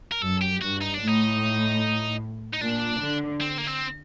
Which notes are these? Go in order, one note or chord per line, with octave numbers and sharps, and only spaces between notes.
A#4
F#2 A4
G4
G2 F#4
D#4
D4
A2
D#4
D#4
A#2 D4
D3
C4
A#3
C4